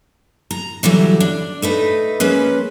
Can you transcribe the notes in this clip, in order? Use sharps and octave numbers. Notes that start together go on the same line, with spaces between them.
A#5
D3 E3 F#3 G3
D4
A3 D#4 B4
G#3 A#3 C#4 B4